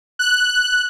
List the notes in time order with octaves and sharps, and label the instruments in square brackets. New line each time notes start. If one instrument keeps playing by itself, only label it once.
[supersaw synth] F#6